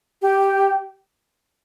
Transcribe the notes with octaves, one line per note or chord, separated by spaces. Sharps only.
G4